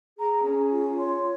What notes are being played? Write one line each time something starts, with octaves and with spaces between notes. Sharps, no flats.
G#4 A#5
C#4
F4
C#5 C6